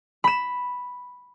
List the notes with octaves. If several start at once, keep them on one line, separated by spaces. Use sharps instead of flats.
B5 E7